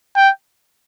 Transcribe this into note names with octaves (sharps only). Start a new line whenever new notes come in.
G5